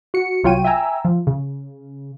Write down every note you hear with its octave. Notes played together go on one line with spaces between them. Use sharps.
F#4 C#7
C2 F#3 F4 C#5 G5 D#7
E5 G5 G#5 A#5 E6
F3
C#3